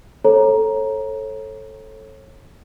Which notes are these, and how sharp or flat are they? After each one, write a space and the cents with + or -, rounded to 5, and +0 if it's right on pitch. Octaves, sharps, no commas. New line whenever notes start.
A4 +0 C#5 -35 A#5 +10